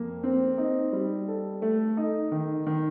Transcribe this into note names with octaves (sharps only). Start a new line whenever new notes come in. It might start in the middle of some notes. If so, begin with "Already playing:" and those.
Already playing: F2 A#3
C4
D#4
G3
A4
A3
D#4
D#3
D#3